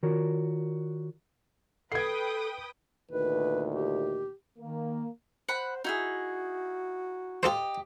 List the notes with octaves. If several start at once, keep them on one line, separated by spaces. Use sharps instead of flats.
D#3 F4 F#4 A#4 C#5 D5
A4 B4 G5 D#6 G#6 C7
D2 A#2 D#3 B4
G4
D#3 A#3
C5 F#5 B5
D#4 E4 F#4 G#4
F4 G4 A4 C5 D#5